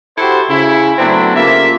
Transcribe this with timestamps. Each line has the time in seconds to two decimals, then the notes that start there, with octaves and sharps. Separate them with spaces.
0.18 E4 F#4 G4 A4 C5
0.49 C#3 E4
0.99 F#3 A3 B3 C4 D4 E4
1.35 C#3 A#3 F4 G4 E5